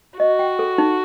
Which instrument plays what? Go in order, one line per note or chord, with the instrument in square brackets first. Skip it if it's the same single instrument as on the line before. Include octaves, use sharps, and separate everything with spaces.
[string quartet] F#4 [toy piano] D#5
[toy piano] G5
A4
D#4